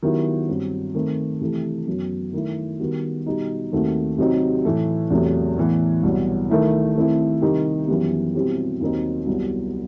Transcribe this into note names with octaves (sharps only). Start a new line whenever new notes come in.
D#3 F#3 B3 E4 G4
G2 F#3 C4
D#3 A3 C4
C3 E3 A3 E4
F#2 F#3 B3
D#3 A3 E4
D#3 G3 B3 F#4
B2 G3 D#4
D#2 D#3 A3 C4 F#4
C3 F#3 C4 D#4 G4
A2 E3 A3
E2 C3 F#3 A3
A2 E3 B3
C2 B2 F#3
D#3 A3 E4
D#3 A3 C4 E4
C3 D#3 G3 D#4 G4
F#2 E3 G3 B3
B2 G3 C4 E4 G4
D#2 D#3 F#3 C4 D#4
C2 C3 F#3 B3